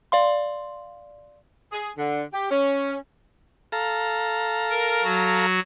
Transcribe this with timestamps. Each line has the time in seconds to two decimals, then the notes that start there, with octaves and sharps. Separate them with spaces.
0.12 D5 F5 C6
1.71 G#4
1.97 D3
2.32 G4
2.50 C#4
3.72 A4 F5 A#5
4.70 A#4
5.04 F#3 F#4